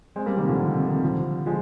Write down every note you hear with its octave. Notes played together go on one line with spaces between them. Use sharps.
G#3 C4
G3 A#3
C3 D#3
D3 F3
C3
C3
C3 D#3
D3 F3
F3 G#3